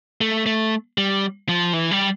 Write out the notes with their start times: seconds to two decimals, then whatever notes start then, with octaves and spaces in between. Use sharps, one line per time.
0.21 A3
0.46 A3
0.98 G3
1.49 F3
1.73 E3
1.91 G3